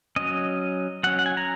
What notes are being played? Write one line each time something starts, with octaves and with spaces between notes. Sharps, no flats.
F#3 C#4 D#5
F#3 C#4 F#5
F#5
G#5
A#5